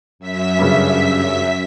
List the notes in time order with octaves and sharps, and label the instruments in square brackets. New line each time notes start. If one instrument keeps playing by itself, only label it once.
[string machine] F#2 E5 B6
[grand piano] G2 C#3